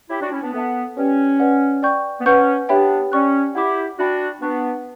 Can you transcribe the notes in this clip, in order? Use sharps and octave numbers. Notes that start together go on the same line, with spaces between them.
E4 G4 C#5 G5 D6
D4 F#4
C#4 E4
B3 D4
B3 A4 E5 A5
C#4 G4 B4 D5 G5
B4 D5 F#5
D5 G5 C#6 G6
B3
C#4 B4 F#5 C#6 G6
B3 D4 G4 C#5 E5 G5 B5
C#4 D5 G5 C#6 F#6
E4 G4 F#5 B5 D6
D4 F#4 E5 G5 B5
B3 D4 B4 F#5 C#6 F#6